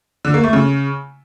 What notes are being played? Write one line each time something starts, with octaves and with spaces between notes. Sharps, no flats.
D3
A#3
A3
C#3